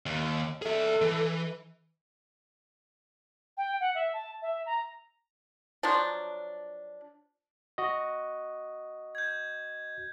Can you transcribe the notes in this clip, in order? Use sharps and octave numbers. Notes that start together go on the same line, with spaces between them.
D#2
G#4 A4 E5
E3
G5
F#5
E5
A5
E5
A#5
F3 F#3 D4
F#4 D#5
G6 G#6